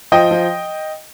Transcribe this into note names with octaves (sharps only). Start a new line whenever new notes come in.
F3 D#5 G5
F3